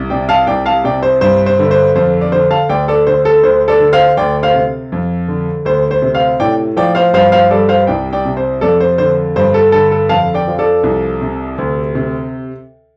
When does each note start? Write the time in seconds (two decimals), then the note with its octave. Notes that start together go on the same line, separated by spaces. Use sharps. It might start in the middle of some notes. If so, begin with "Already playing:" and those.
Already playing: C2
0.10 C3 D5 G5
0.29 F5 A5
0.47 C2 D5 G5
0.66 F5 A5
0.84 C3 D5 G5
1.03 C5
1.21 G2 C5
1.46 C5
1.59 D3
1.71 C5
1.95 F2 C5
2.21 D5
2.32 D3 C5
2.51 F5 A5
2.69 D2 D5 G5
2.88 A4 D5
3.07 D3 C5
3.25 A4
3.43 D2 C5
3.68 A4 D5
3.80 D3
3.93 C5 F5
4.17 D2 D5 G5
4.43 C5 F5
4.54 C3
4.92 F2
5.28 D3
5.65 D2 C5
5.91 C5
6.02 C3
6.15 C5 F5
6.40 A2 D5 G5
6.77 F3 D5 G5
6.95 C5 F5
7.13 G2 C5 F5
7.32 C5 F5
7.51 G3 A4 D5
7.69 C5 F5
7.87 C2 D5 G5
8.13 D5 G5
8.25 C3
8.37 C5
8.61 F2 A4 D5
8.80 C5
8.98 D3 C5
9.36 G2 C5
9.54 A4
9.72 D3 A4
9.91 A4
10.09 F2 F5 A5
10.34 D5 G5
10.48 F3
10.59 A4 D5
10.83 C2
11.22 C3
11.58 D2
11.95 C3